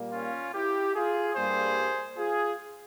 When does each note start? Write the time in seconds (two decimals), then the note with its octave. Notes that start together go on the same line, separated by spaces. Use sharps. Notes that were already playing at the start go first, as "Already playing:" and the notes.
Already playing: A#2 G3 A#3
0.12 C#4 F4
0.53 E4 G4
0.94 F4 G#4
1.35 G2 G3 A#3 G#4 C5
2.16 F4 G#4